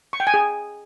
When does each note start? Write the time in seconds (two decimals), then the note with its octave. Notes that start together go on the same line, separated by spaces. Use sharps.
0.13 C#6
0.20 G5
0.27 G#5
0.34 G#4